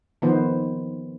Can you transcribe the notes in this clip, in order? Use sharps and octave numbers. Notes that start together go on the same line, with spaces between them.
D#3 F3 B3 F4 C5